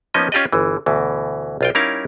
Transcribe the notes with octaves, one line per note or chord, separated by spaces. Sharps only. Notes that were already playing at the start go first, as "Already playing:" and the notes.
F3 A#3 B3 C#4 D#4 D#5
C#4 F4 G4 D5 D#5
G1 E3
D2 B2 E3
B1 F4 G5
G3 C#4 D#4 E4 A#4 F5